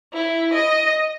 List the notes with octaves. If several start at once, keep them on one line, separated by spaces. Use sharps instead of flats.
E4
D#5